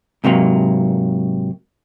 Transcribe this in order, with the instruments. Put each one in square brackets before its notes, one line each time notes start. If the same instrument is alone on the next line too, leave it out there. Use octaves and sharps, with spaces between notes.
[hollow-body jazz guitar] G#2 C3 F#3 A#3